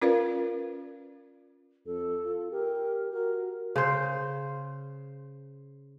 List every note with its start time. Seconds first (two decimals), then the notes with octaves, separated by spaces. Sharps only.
0.02 C#4 F4 A#4 B4 D5 F5
1.86 F2 A4
2.24 F4
2.52 G4 A#4
3.13 F#4 A#4
3.76 C#3 C5